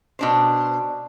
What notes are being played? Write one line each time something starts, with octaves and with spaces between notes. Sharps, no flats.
B2 D4 C5